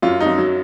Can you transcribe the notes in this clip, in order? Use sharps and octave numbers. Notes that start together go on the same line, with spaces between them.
F#2 F4
D#4
F#2
F#3